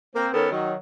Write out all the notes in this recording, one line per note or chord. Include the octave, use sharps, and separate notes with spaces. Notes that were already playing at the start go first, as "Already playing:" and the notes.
A#3 C4
D#3 B3 C#4 A4 A#4
D#3 F#3